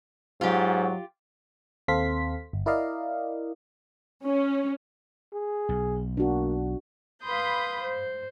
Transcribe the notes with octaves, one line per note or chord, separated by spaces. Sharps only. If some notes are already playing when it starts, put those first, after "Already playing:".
G#2 F#3 F4 G4
D#2 C4 A4 F5 C6 B6
G1
E4 A#4 D5 D#5 F5
C#4
G#4
B1
A#3 D4 F#4
B4 F5 B5 C6 D#6 G6
C5